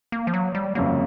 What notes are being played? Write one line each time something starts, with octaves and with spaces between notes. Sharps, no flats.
A#3
F3
F#3
G3
G1 F2 C#3 F#3 A#3